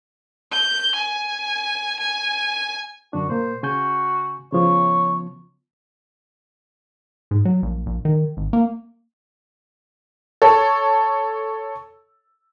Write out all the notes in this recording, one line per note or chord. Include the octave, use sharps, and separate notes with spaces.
G6
G#5
G#5
F#2 D3 D4 F#4
A#2 A#3 C5
C#3 F#4 G#5 G6
C#3 F3 B3 C#5
G#2
F#3
A#1
A#1
D#3
G#1
A#3
A4 C#5